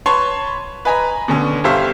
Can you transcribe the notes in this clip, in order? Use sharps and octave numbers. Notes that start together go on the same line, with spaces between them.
B4 C#5 A5 C6 C#6
B4 D#5 G#5 A#5 B5
B2 D3 C#4
G1 G4 A4 C5 E5 F5